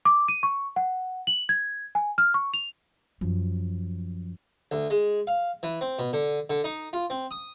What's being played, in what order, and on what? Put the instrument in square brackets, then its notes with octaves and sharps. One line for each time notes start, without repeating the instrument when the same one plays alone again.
[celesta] D6
D#7
C#6
F#5
F#7
G#6
G#5
F6
C#6
F7
[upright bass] F#2 F3
[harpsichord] D2
G#3
F5
E3
C4
B2
D3
D3
D#4
F4
C4
D#6